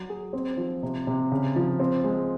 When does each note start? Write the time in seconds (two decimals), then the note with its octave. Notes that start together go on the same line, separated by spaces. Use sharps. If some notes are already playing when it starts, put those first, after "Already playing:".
Already playing: F#3
0.09 G#4
0.33 C4
0.57 F3
0.83 C3
1.07 C3
1.32 C#3
1.56 F3
1.80 C4
2.04 G#3